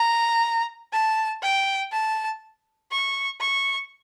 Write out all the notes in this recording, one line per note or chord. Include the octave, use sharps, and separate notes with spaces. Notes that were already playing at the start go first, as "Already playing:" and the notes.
Already playing: A#5
A5
G5
A5
C#6
C#6